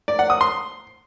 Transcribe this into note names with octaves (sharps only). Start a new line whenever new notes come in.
D5
F#5
D#6
C6